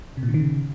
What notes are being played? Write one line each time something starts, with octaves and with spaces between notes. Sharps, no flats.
C3
A#2
D3
D#3
C#3